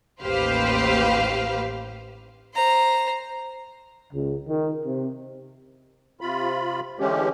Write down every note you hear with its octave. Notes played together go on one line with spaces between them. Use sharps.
A1 D#2 G4 B4 C5 F5
C5 A#5
C#2
D#3
C3
C3 F4 B5
D3 E3 G#3 A3 C#4 G4